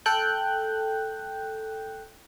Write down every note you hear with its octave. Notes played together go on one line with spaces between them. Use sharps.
A4 G5 F#6 G6